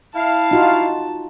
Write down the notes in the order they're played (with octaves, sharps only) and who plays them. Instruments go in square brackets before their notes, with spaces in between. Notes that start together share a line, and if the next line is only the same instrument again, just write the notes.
[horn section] E4 F5 [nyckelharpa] A5
[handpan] D#4 F4 F#4